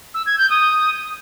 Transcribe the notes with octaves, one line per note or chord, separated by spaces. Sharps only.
E6
G#6
G6
D#6